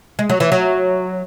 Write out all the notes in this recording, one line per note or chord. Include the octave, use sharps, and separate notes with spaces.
G#3
F#3
E3
F#3